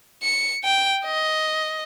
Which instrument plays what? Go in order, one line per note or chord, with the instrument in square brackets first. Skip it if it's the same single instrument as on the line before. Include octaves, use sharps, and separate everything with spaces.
[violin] C#7
G5
D#5